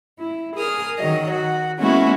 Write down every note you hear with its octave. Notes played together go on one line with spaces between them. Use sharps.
E4
G#4 A#4 D#6 F6
D#3 F#3 D#5
F#4
G#3 A#3 B3 C#4 E4 F#4